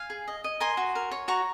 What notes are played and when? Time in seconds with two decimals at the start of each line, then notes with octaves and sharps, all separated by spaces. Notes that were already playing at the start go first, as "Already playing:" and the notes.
Already playing: F5 G#5
0.10 G#4
0.28 D#5
0.44 D#5
0.60 A#4 G#5 C6
0.77 F#4
0.95 A#4
1.11 C#5
1.28 F#4 A#5 C#6